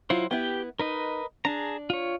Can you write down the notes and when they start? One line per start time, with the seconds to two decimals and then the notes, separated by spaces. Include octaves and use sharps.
0.10 F#3 E4 F4 C5
0.31 B3 E4 G4 G5
0.79 D#4 A#4 B4 D#5
1.45 D4 G#4 A5 A#5
1.90 F4 C#5